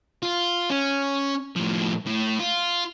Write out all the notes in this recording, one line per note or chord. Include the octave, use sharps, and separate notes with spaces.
F4
C#4
A2 F3
A2
F4